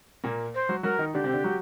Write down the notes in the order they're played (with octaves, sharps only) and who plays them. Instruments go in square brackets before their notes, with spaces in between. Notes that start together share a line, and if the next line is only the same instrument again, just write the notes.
[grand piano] A#2 A#3
[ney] C5
[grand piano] F#3 F#4
[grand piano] F#3 F#4 [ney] A#4
[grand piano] D#3 D#4
[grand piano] D3 D4 [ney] G4
[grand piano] C3 C4
D3 D4
F#3 F#4